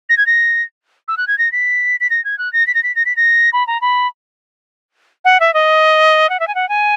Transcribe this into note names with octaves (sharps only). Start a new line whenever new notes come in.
A#6
G#6
A#6
E6
F#6
G#6
A#6
B6
B6
A#6
G#6
F#6
A#6
B6
A#6
B6
A#6
B6
A#6
B5
A#5
B5
F#5
E5
D#5
F#5
E5
G#5
F#5
G#5